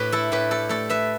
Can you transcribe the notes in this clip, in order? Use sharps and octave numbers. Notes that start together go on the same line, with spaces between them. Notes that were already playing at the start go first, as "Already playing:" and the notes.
Already playing: A2 G4 B4
E4 A4
A2 G4 B4
A4 D5
A3 A4 D5
B4 E5